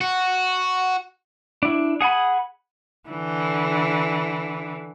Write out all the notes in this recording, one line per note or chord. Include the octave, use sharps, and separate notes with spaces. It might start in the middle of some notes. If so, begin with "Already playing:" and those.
F#4
D4 E4
G#4 F#5 G#5 B5
D3 E3